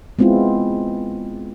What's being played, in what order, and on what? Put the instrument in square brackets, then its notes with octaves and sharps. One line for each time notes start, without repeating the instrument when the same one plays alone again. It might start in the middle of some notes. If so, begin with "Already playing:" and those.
[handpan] G#3 B3 C4 E4 F4